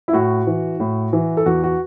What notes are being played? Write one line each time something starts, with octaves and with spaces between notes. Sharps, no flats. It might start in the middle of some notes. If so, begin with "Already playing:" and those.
E4
A2 F#4
E3
A2
E3
A4
E2 F#4
F#4